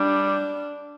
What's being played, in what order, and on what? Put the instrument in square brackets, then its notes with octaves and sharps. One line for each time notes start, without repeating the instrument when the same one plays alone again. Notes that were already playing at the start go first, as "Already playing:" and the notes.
Already playing: [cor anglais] G3 [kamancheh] D4